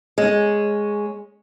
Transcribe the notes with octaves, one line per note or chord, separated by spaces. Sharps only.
G#3 C#4